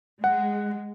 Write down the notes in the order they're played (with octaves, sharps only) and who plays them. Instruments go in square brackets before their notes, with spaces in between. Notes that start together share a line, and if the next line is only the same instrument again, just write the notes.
[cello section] G#3 [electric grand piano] F#5